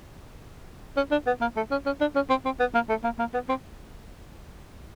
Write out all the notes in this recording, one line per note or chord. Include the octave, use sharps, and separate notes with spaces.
C#4
D4
B3
A#3
A3
C#4
C#4
D4
C#4
C4
C4
B3
A#3
A3
A#3
A#3
B3
C4